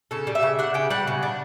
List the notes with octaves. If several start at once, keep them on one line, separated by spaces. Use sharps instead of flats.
C#3 A4
G3
E5
C#3
D4 F#5
C#3 G5
G3 F#5
C#3
D4